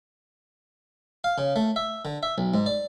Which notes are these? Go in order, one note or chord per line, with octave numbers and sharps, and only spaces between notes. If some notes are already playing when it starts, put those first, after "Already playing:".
F5
C#3
A3
E5
D3
E5
B1
G#2
D5